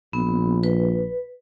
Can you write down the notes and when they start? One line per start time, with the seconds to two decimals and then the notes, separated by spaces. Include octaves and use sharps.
0.13 A#1 B3
0.63 B4